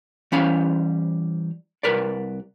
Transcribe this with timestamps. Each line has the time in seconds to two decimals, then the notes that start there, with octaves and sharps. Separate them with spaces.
0.32 E3 G3 C#4 C5 F5 B5
1.83 C2 A#4 B4 D5